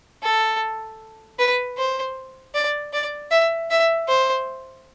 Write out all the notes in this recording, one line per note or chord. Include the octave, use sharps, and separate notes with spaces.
A4
B4
C5
D5
D5
E5
E5
C5